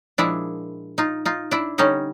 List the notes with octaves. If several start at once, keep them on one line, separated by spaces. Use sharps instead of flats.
A#2 F3 G#3 D4 E4
D#4 F4
D#4 F4
D4 E4
D3 G3 C#4 D#4